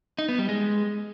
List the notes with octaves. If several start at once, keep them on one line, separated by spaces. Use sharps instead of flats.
D#4
B3
G3
G#3